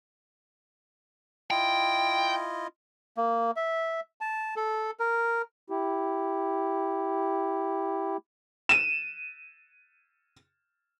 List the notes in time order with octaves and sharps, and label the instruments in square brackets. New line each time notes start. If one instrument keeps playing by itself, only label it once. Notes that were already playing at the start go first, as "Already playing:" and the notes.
[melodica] E4 F4 D#5 [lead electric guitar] G5
[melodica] A#3
E5
A5
A4
A#4
[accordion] E4 G4
[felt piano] D#7 E7